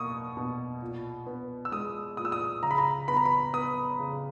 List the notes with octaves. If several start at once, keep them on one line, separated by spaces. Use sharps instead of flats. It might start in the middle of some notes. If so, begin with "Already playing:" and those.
Already playing: B2 A#3 C#6 D#6
B2
A#2
B3
E6
G#3 D#6
A#2 D#6
E6
D#6
C#3 A#5
B5
A#5
B3 B5
A#5
B5
B3 D#6
C#3